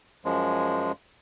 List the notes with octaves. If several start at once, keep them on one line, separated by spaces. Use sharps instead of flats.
F#2 F3 G#3